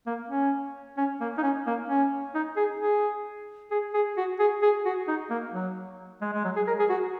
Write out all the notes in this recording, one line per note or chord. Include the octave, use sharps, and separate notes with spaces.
A#3
C#4
C#4
A#3
D#4
C#4
A#3
C#4
D#4
G#4
G#4
G#4
G#4
F#4
G#4
G#4
F#4
D#4
A#3
F#3
G#3
G#3
F#3
G#4
A#4
G#4
F#4